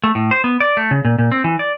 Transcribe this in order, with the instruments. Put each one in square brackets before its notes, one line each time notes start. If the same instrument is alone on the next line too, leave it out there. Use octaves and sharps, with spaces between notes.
[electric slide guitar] A3
A2
C5
B3
D5
A3
C#3
A#2
A#2
C4
E3
D5